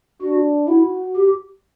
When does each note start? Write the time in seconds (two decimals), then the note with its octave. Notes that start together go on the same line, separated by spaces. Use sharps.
0.22 D4 F#4
0.68 E4 F#4
1.16 G4